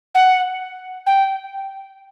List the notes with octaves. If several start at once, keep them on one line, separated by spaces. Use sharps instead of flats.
F#5
G5